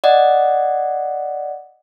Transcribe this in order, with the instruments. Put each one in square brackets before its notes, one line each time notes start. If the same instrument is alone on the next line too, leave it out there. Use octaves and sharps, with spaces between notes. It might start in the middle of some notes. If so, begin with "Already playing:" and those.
[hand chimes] D5 D#5 F#5